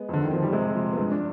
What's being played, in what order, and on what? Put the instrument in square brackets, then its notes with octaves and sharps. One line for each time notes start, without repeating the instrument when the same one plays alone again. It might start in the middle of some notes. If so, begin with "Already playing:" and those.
Already playing: [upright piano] G#3 [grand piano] B3
[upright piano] F2 [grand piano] D3
[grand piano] D#3
[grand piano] F3 [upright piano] C4
[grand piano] G3
[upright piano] C3 [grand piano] G#3
[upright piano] F3
[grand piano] B3
[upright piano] G2 [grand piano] G#3
[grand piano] D4